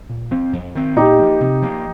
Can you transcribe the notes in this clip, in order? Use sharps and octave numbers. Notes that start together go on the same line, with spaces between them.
A#2
F3 C4
F2
D#3 C4
A#2 D#4 G4
F3 A#3
C3
F3 A#3